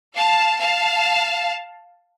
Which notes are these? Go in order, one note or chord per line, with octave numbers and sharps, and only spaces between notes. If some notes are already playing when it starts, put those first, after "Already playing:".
F5 A5
F5 A5